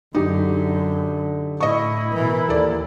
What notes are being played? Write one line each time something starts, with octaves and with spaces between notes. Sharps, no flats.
F#2 D3 D#4 G4
A2 E4 D#5 C#6
B2 E3 A#4
D#2 A4 D5